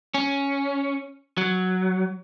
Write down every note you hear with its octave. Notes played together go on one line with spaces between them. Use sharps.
C#4
F#3